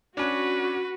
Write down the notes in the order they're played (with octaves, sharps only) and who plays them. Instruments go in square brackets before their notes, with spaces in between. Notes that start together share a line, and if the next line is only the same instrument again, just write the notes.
[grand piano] C#4 D4 [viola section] F#4 [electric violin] B4